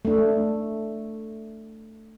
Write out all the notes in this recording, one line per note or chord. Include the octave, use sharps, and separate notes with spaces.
A3 D4